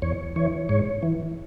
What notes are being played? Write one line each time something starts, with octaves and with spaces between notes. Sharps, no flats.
E2 C#5
E3 C#5
G#2 C#5
E3